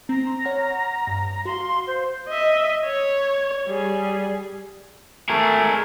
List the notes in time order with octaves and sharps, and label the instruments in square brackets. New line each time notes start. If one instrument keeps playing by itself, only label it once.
[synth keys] C4 [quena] A#5
[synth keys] C6
C#5 F#5 F6
G2
[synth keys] F#4 F5 [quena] C6
[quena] C5
[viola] D#5 E5
C#5
G3 G#4
[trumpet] A3 [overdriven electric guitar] G#4 A#4